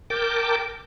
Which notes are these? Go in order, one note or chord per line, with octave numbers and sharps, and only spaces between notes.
A#4 G5 A5 D6